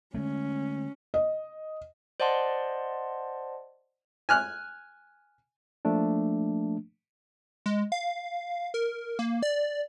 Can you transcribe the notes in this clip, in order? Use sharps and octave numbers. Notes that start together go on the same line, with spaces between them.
D3 G#3 A3 C#4
D#5
C5 D5 D#5 F#5 A5 C6
G#5 F6 F#6
F3 A3 A#3 D4
G#3
F5
A#4
A#3
D5